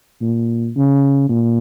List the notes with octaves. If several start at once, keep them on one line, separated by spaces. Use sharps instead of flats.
A#2
C#3
A#2